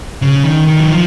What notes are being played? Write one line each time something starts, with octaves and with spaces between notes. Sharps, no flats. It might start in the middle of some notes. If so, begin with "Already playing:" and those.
C#3
D#3
D#3
F#3
F3